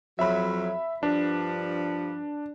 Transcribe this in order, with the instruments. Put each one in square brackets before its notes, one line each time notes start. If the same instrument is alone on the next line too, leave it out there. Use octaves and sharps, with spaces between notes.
[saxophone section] F2 F#3 [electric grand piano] E5 B5
[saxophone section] G2 F3 B4 [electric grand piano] D4